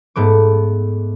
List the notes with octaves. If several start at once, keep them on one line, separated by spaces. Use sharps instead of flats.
G#2 A3 B3 D6